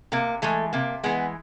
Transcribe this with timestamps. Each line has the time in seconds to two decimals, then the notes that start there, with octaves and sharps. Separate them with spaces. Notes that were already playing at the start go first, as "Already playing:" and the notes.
0.12 C3 A#3
0.42 E3 G#3 A3
0.73 C3 A#3
1.03 E3 G#3 B3